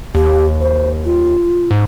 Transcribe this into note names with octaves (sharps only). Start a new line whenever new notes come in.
D#2 G4
C5
F4
G#2